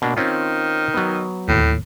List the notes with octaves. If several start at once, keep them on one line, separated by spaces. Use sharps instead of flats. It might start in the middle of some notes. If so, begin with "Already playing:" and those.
B2 A#3 D4
D#3 C4 C#4 F4
F#3 B3
D1 D#2 A2